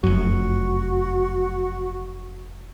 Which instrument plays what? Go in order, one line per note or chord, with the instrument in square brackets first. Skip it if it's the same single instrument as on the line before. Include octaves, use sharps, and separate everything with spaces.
[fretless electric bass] F1 F#2 [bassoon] F#4